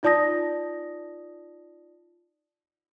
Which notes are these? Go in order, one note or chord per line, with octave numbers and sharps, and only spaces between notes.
D#4 F4 D5 A5 D#6 A#6